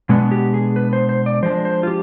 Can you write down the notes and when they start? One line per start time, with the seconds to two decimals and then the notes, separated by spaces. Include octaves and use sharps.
0.09 B2 G#3 B3 D4
0.31 G4
0.54 G#4
0.76 B4
0.93 C5
1.09 C5
1.26 D5
1.43 F3 G#3 D4 C5
1.65 C5
1.83 F4
1.87 G4